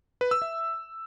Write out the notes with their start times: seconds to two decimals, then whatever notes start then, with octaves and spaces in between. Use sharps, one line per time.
0.21 B4
0.31 E6
0.42 E5